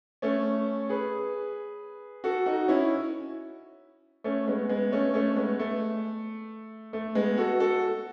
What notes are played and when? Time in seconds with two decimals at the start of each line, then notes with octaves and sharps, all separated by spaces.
0.22 A3 C#4
0.89 G#4 B4
2.24 F#4 A4
2.46 D#4 F#4
2.68 C#4 E4
4.24 A3 C#4
4.47 G#3 B3
4.69 G#3 B3
4.92 A3 C#4
5.14 A3 C#4
5.36 G#3 B3
5.59 A3
6.93 A3
7.15 G#3 B3
7.38 F#4 A4
7.60 F#4 A4